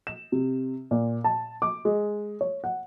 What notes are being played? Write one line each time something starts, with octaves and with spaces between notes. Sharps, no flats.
E7
C3
A#2
A5
D6
G#3
C#5
F#5